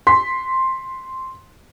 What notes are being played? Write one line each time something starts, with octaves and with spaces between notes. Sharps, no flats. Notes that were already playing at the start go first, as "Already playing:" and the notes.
C6 B6